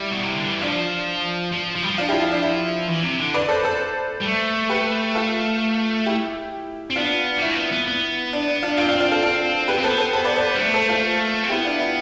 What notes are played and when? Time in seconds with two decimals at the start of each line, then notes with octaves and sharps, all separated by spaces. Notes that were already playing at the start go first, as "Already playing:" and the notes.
Already playing: G3 E4
0.11 B2
0.23 C3
0.36 D3
0.49 E3
0.62 F3 D4 F4
1.52 F3
1.76 F3
1.83 G3
1.91 F3
1.98 D4 F4
2.09 E4 G4
2.21 E4
2.31 D4
2.43 E4
2.89 E3
3.03 C3
3.19 D3
3.34 B4 D5
3.48 A4 C5
3.64 A4 C5
4.20 G3
4.24 A3
4.69 G4 B4
5.15 F4 A4
6.06 E4 G4
6.90 C4
6.96 B3 D4 F4
7.37 G3
7.42 A3 E4
7.51 C4
7.57 B3
7.72 B3
7.87 B3
8.33 D4
8.48 D4
8.63 D4 F4
8.77 C4 D4 F4
8.88 D4 F4
9.00 D4 F4
9.11 F4 A4
9.22 F4 A4
9.68 B3 G4 B4
9.78 C4
9.83 B3 A4 C5
9.98 A4 C5
10.13 A4 C5
10.25 B4 D5
10.36 A4 C5
10.54 G3
10.59 A3
10.74 A4 C5
10.89 F4 A4
11.43 C4
11.49 B3 E4 G4
11.64 D4 F4
11.79 E4